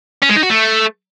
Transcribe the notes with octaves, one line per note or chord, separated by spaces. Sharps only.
C#4
G#3
D#4
F#4
A3